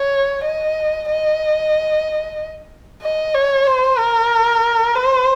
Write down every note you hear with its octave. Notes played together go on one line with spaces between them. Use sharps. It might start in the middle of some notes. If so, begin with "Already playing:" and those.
Already playing: C#5
D#5
D#5
D#5
C#5
C5
A#4
C5